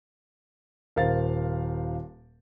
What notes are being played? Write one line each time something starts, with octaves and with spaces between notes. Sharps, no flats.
D#1 A#4 C5 F5 A6